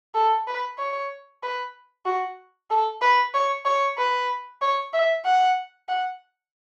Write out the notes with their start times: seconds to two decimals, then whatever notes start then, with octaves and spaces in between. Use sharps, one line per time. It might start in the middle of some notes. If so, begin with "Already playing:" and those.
0.15 A4
0.47 B4
0.79 C#5
1.43 B4
2.06 F#4
2.70 A4
3.02 B4
3.34 C#5
3.66 C#5
3.98 B4
4.62 C#5
4.94 E5
5.25 F#5
5.89 F#5